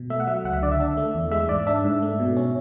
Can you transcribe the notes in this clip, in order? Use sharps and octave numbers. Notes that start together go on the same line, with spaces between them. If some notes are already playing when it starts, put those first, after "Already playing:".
Already playing: B2
A3 E5
F#5
F#3 E5
C#2 F#5
E5
D3 D5
E5
D4
A3
E2
G#3 E5
G#2 D5
D4 E5
G#2
A3
B2
C#4